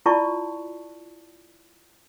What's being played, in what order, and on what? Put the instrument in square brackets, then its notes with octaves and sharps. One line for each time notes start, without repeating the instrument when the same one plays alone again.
[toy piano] E4 F4 D5 A5 C#6